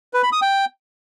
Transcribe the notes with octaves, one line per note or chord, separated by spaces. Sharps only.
B4
B5
D#6
G5